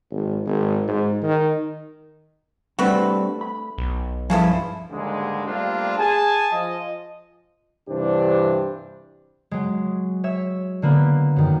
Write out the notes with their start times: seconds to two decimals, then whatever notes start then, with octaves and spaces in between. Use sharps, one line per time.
0.11 G#1
0.46 G#1
0.88 G#2
1.23 D#3
2.79 G3 A3 C4 D4 F#4 B4
3.41 B5
3.78 B1
4.30 G2 F3 C#4 E4 G#4 A4
4.90 D#2 G#2 D3 G3 G#3
5.45 G3 A3 A#3 C4 D4 F4
5.97 G#4 G#5 A5
6.52 F3 D#5
7.89 G2 C3 E3 D4 G4 C5
9.51 F#3 G#3
10.24 C#5 E5 E6
10.82 D3 A#3 B3 B4
11.36 F#2 D#3